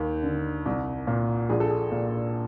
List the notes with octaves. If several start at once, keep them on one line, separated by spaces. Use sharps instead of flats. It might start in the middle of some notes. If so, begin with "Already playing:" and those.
Already playing: D#2
D3
C2
A#2
A#1 G#4
A4
G#4
A#2